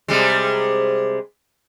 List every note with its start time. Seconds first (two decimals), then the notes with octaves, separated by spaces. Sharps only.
0.08 C3 G3 G#3